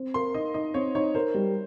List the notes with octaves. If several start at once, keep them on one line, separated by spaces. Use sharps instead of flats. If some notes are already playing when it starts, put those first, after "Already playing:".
Already playing: C4
A#4 C6
D#4 D#5
D#4 D#5
C4 C#5
D#4 C#5
A#4 C5
G3